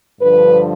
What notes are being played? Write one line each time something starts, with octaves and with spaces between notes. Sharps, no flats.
G2 D3 F3 B4